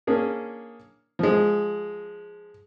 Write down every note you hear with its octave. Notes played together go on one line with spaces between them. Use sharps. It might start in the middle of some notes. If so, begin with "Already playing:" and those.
A#3 C#4 D4 G#4
F3 G#3